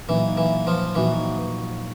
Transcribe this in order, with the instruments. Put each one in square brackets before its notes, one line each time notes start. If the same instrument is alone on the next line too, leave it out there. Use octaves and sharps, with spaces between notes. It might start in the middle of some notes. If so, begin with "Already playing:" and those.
[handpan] A#2 F#3 A#3 D#4 [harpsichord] E3
[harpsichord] E3
F3
[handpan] A#2 F3 A#3 D#4 F#4 [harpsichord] E3